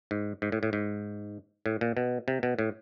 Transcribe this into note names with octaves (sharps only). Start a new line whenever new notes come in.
G#2
G#2
A2
A2
G#2
A2
A#2
B2
C3
B2
A2